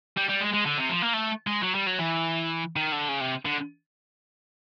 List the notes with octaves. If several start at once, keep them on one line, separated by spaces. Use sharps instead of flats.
G3
G3
G#3
G#3
D3
C3
F3
A#3
A3
G#3
F#3
G3
F#3
E3
D#3
D3
C#3
C3
D3